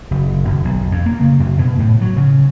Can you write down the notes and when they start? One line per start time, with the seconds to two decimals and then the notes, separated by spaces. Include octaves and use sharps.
0.11 F#1
0.44 F#1
0.65 B1
0.92 F2
1.06 A#3
1.20 C#3
1.40 F#2
1.58 B2
1.79 A2
2.01 F#3
2.16 C#3